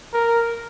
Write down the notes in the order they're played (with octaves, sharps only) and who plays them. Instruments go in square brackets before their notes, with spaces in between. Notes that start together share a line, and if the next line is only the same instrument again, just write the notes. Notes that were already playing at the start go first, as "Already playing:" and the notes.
[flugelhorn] A#4